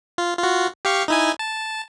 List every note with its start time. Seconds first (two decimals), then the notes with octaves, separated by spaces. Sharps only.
0.18 F4
0.39 F4 F#4
0.85 G4 F5 C#6
1.08 D#4 E4 G#5
1.39 A5